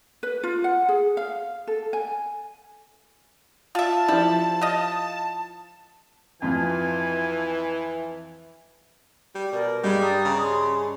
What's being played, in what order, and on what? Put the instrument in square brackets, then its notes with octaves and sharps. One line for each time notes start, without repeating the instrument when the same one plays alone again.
[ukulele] B4
F4
F#5
G#4
F5
A4
G#5
[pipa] F4 E5 [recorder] A5
[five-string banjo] F3 E4 [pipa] G3
[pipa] D#5 F5
[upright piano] F2 F3 F4 [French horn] E3 [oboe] G#5
[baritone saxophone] G3
[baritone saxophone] B2 [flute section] A#4 D5
[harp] G2 D#5 [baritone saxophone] G3 [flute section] G#4 G5 B5
[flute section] D4 A#5 D#6
[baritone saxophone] C#3
[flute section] C6